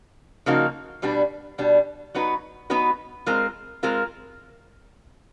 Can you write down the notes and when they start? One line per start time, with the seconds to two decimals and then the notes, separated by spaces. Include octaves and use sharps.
0.46 C#3 F3 A#3 D#4 F#4
1.02 B2 G3 B3 D4
1.58 B2 G3 B3 D4
2.15 F#3 B3 D#4 F#4 B4
2.70 F#3 B3 D#4 F#4 B4
3.26 G#3 C4 F4 A#4
3.83 G#3 C4 F4 A#4